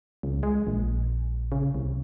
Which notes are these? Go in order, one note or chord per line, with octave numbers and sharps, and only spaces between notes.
C#2
G#3
A#1
C#3
C2